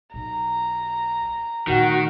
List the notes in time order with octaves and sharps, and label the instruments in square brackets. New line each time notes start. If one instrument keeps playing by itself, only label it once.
[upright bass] B1 [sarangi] A#5
[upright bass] A#2 A3 [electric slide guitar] D#3 [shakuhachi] F#4